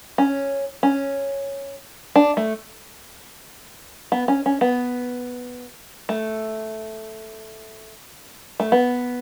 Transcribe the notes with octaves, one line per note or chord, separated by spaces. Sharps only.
C#4
C#4
D4
A3
B3
C#4
C#4
B3
A3
A3
B3